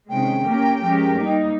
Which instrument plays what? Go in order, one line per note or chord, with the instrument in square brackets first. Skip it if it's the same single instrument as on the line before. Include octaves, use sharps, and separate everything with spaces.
[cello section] C3 D#3 G#3 C#4 [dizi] G5
[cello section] A#3 C#4 G4 A#4
F3 G#3 C#4 G4 A#4
G3 A#3 D#4